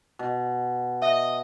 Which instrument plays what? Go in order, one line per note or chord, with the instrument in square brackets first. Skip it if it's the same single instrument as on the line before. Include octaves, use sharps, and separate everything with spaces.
[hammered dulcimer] B2
[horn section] D#5 [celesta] E5